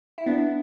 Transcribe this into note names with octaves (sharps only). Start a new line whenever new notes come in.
E4
B3 D4